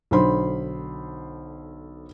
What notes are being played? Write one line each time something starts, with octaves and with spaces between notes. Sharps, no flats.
B1 D3 C5 B5 C6